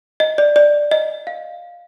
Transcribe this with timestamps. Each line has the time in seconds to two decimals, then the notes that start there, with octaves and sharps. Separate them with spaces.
0.20 D#5
0.38 D5
0.56 D5
0.91 D#5
1.27 F5